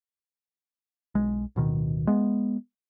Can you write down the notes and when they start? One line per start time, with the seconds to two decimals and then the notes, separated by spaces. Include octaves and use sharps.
1.15 B1 G#3
1.56 D1 B2 D#3
2.07 G#3 B3